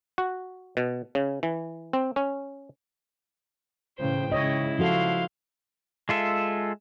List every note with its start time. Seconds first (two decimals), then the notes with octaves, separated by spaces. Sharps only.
0.18 F#4
0.77 B2
1.15 C#3
1.43 E3
1.93 C4
2.16 C#4
3.99 A2 C#3 E3 C5 G5
4.32 G#2 C#3 E4 C#5 D#5
4.79 F3 F#4 A4 F5 C6
6.09 G#3 F4 A4 E5